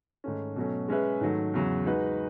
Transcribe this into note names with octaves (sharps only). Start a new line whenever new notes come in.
G#2 D#3 A3 C#4
B2 F#3 A3 C#4
G#3 C#4 G#4 B4 E5
G#2 D#3 F#3 A3
E2 C#3 F#3
G#3 D#4 F#4 B4